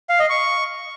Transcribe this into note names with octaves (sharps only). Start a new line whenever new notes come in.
F5
D#5
C#6